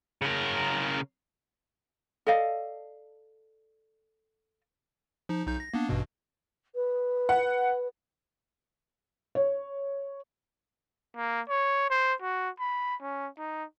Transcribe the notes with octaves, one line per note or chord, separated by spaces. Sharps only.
C#3 A#4
A4 D5 D#5 F5
F3 D#4
B1 D#4 G6
A#6
A#3 B3 D4
A1 G2 B2
B4
F#5
C#5
A#3
C#5
C5
F#4
B5
C#4
D#4